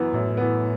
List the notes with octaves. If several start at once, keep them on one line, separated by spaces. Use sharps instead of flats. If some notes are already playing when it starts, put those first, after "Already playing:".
Already playing: F#2 E3 B3
F#2 A2
E3 B3